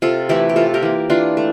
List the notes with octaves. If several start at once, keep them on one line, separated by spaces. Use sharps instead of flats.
C3 F4 A4
E3 A3 E4 G4
G4
C3 F4 A4
G4 A#4
E3 A#3
E3 D4 F4
A3